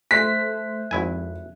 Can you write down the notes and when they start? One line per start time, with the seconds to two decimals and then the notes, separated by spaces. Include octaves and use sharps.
0.11 A3 C5 E5 F#6 B6
0.91 G#1 F2 E4 G#5